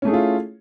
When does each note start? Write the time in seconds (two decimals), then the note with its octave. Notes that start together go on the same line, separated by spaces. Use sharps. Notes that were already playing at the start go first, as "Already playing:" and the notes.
0.02 C#4
0.05 A3
0.08 G#4
0.11 E4
0.14 F4